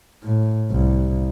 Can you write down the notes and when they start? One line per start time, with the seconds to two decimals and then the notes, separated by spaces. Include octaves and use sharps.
0.24 A2
0.72 C2